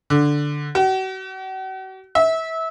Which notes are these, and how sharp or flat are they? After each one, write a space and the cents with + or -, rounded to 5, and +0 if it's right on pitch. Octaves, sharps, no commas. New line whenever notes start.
D3 +0
F#4 +40
E5 -25